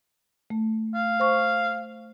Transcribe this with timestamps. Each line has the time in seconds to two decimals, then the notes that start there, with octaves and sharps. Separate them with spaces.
0.50 A3
0.95 F5
1.20 C5 C#6